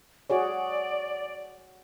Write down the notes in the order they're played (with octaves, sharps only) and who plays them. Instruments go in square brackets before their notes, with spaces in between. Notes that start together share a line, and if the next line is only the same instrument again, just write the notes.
[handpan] F#4 G#4 C#5 [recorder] D5